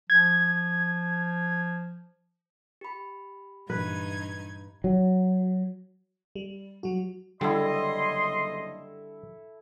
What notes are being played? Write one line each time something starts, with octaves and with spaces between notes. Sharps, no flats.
F3 G#6
G4 B5
G2 A#2 E3 D#4 B4 G#6
F#3
G3
F#3 G3 F#4
F#1 D3 G3 E4 A4 D#5 E5 C6